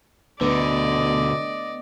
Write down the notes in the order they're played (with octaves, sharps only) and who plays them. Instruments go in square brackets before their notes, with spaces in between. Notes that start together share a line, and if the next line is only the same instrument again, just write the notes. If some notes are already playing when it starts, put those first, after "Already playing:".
[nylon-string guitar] D2 [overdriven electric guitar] B2 D3 [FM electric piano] B3 [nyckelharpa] D5 D#5